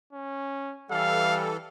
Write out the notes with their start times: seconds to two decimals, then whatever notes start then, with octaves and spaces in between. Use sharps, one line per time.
0.13 C#4
0.91 E3 G3 A4 F5